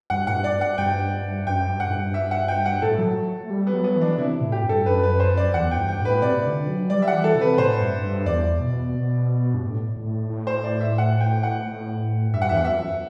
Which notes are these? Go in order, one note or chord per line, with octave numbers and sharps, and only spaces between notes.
G2 F#5
A2 F#5
G2
D5
F#5
G2 G5
F#2 G5
G2
F#5
A2
G2
E5
F#5
G5
F#5
A2 A4
F#3
A3
G3
B3
F#3
B3
E3
D4
C3 E4
A2
G4
G2
A4
F#2 B4
B4
C5
D5
E2 F#5
G5
G2
G5
A2
B4
C3 D5
D3
F#3
G3 D5
E5
F#5
E3
A4
C3
B4
A2 C5
G2
G2
E2 D5
B2
B2
G2
A2
A2
A2
C5
D5
E5
F#5
G5
F#5
A2
G2 E5
F#5
E2 E5
F#5
F#2 E5